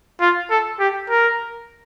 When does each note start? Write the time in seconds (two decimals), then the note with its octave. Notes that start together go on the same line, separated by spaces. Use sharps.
0.21 F4
0.51 A4
0.80 G4
1.10 A#4